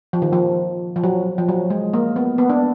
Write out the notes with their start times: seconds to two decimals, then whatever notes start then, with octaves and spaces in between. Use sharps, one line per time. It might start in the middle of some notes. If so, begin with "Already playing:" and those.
0.13 F3
0.22 D#3
0.33 F3
0.96 F3
1.04 F#3
1.38 F3
1.49 F#3
1.70 G#3
1.93 A#3
2.16 B3
2.38 B3
2.50 D4